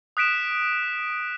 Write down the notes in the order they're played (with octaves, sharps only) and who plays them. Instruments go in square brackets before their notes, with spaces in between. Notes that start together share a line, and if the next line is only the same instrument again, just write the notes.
[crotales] D#6 F#6 B6 D7 E7